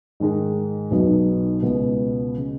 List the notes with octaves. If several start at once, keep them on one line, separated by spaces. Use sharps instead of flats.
G#2 D#3 G#3 D#4
B1 B2 F#3 D#4
C#2 B2 B3
C#3